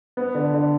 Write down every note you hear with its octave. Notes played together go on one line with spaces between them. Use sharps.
B3
D3
D3